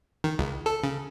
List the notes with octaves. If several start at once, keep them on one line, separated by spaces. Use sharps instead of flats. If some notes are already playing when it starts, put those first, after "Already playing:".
D#3
C#2
A4
C#3